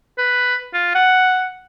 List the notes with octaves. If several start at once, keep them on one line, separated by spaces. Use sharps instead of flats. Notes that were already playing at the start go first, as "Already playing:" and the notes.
B4
F4
F#5